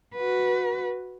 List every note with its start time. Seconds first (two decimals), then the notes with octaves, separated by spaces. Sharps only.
0.15 F#4 B4